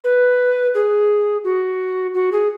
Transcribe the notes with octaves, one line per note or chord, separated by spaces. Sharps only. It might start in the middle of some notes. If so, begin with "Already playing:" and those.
B4
G#4
F#4
F#4
G#4